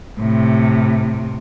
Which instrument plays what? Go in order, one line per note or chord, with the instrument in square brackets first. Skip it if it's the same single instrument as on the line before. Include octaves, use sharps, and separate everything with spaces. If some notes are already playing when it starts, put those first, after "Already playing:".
[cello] A2 C3